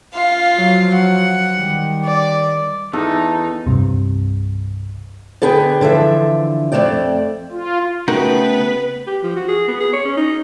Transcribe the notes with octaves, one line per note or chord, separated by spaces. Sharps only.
F4 F5
F3 F#3
F#5
D#3 G3
D5
E2 D#4 A4
C2 G2 C3
D3 B3 G#4 B4 G5
D3 E3 F3 E5
F2 F#3 A3 D5 G5
F4
C#3 A3 B3 D#4 F#4 A#4 B4 G5
G4
F3
F#4
G#4
B3
G#4
C#5
C#4
D#4